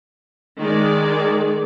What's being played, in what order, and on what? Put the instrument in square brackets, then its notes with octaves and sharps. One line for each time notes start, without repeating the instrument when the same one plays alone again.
[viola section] D#3 G#3 D5